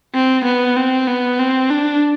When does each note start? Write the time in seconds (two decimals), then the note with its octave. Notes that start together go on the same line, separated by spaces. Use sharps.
0.14 C4
0.45 B3
0.76 C4
1.08 B3
1.39 C4
1.70 D4